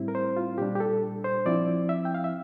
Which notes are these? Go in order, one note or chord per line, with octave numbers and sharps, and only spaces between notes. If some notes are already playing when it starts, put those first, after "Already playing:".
Already playing: A2 G3 C4 E4
A#4
C5
F4
A#2 G3 D4 G4
G4
A4
C5
F3 C4 E4 D5
E5
G5
F5
E5